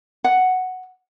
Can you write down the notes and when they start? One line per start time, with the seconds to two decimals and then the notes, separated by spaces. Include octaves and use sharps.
0.24 F#5